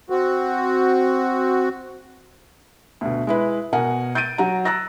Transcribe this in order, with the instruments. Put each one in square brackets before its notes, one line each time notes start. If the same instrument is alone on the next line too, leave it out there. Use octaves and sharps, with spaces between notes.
[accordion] C4 F#4
[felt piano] D2 B2
G#3 E4 B4
B2 A#4 F#5 G#5
G6 A6 D7 D#7
F#3 F#4 A#5
A#5 E6 F#6 A6 A#6